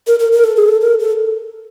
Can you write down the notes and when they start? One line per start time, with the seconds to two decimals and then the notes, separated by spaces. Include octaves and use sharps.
0.07 A#4
0.20 A#4
0.32 A#4
0.44 A4
0.56 G#4
0.68 A4
0.81 A#4
1.00 A4